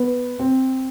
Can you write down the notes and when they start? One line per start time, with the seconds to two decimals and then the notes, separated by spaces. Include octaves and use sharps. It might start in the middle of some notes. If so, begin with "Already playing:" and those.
Already playing: B3
0.39 C4